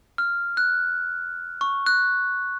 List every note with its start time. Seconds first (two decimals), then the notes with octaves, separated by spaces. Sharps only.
0.18 F6
0.57 F#6
1.61 C#6
1.86 F#6